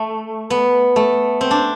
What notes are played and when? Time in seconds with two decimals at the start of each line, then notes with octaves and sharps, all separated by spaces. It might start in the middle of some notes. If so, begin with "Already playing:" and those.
Already playing: A3
0.50 B3
0.96 A3
1.41 C4
1.51 D4